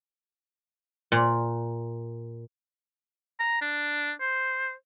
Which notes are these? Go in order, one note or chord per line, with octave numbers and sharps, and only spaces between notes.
A#2
A#5
D4
C5